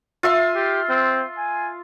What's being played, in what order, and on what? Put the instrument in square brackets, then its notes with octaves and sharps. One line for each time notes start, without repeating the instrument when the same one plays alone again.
[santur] F4 E5 C6
[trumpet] G4
C4
G#5